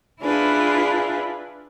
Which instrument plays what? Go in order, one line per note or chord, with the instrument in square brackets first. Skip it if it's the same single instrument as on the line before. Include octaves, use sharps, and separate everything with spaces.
[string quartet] D4 E4 F4 G#4 B4